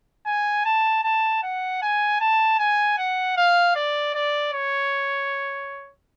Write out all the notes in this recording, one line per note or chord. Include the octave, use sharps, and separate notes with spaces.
G#5
A5
A5
F#5
G#5
A5
G#5
F#5
F5
D5
D5
C#5